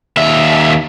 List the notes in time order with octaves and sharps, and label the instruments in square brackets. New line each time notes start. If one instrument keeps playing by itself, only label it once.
[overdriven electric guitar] D#2 E5